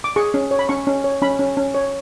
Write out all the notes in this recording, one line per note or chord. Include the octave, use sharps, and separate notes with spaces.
D6
G#4 C#6
C#4
C#5
B5
C#4 C#6
C#4
C#5
C#4 B5
C#4
C#4
C#5